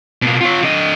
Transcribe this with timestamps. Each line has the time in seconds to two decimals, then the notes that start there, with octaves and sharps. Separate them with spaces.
0.22 B2 A#3
0.41 F4 C#5
0.63 D3 D#5